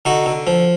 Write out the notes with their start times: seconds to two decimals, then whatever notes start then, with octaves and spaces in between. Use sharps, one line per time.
0.05 D3 D#4 F#4
0.26 D3
0.47 F3